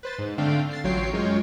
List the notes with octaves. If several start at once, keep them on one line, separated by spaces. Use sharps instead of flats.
B4 C5 A6
G#2
D3 A3 C4 D4 F5 G5
A6 C7
A1 F#3 F4 C#5 G5 C7
F#2 G#3 F4 C#5 G5